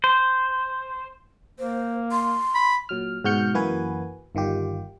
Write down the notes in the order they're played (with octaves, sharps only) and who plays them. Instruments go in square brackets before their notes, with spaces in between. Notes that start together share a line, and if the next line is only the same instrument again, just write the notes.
[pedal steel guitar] C5
[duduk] A#3 [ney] C5
[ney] C6
[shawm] B5
[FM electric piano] A#2 F#3 F6
G#2 B2 F#4 F6 G6 C#7
F#2 E3 A#3 F#4 B4 G#5
G1 D#3 F4 G4